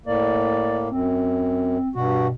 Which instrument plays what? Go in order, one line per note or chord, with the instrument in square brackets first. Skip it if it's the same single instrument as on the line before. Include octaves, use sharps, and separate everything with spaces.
[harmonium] A2 A#3 [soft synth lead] D5
[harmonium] F#2 [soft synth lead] C4
[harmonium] G2 F#4 [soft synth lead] B2